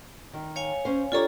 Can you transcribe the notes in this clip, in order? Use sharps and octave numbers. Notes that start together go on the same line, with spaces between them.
D#3
C#5 F5 G#5
C#4 C5
D4 F4 G4 A4 C#5 A#5